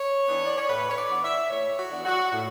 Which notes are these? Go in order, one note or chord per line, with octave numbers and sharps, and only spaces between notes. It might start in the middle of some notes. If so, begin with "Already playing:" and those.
Already playing: C#5
E3 B3 D4
D5
C#5
A2 B4
C#5
D5
E3 B3 D4
E5
A2 C#5
F#4
E3 B3 D4
F#4
A2